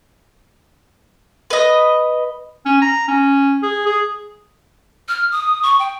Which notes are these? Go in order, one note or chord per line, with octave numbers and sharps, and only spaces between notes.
B4 D#5
C#4
A#5
C#4
G#4
G#4
F6
D#6
C#6
G5